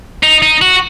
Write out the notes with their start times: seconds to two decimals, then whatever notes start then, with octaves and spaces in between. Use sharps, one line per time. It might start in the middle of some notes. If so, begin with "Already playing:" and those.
0.23 D#4
0.42 D#4
0.62 F#4